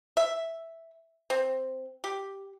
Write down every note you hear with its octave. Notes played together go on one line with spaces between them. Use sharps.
E5
C4
G4